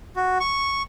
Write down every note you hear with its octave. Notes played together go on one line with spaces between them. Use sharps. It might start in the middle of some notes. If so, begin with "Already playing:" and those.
F#4
C#6